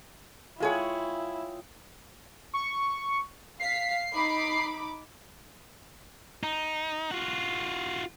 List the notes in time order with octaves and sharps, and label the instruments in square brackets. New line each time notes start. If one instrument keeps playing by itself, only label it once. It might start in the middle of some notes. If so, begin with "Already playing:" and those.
[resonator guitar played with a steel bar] G#3 G#4 C#5 [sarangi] E4 [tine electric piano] F4 F5 G5
[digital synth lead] C#6
[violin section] F5 B6 [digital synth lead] C7
[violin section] D#4 B5 D6
[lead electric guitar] D#4
F4 F#4